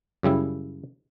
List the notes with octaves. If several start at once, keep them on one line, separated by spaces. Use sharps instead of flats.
F#2 C#3 G3 E4